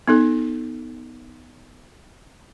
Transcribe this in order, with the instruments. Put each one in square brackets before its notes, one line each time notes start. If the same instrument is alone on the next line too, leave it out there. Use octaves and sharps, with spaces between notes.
[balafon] B3 D#4 A4